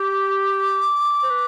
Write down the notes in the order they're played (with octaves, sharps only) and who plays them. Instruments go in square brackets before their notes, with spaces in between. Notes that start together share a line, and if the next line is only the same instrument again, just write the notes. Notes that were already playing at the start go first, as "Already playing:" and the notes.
Already playing: [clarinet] G4 [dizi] D6
[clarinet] C5
B4